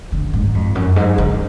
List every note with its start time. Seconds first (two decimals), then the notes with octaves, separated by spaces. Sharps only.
0.12 D3
0.33 G#2
0.54 F2
0.75 F#2
0.96 G#2
1.18 D3